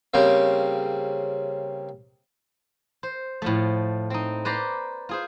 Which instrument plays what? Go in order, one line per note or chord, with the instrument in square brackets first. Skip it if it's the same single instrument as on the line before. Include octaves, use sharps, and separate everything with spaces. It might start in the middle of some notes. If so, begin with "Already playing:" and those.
[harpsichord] C#3 G3 A#3 C4
[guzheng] C5
A2 F3 A3
C4 D#4
B4 C5 D5 A#5 C6
F4 G#4 C5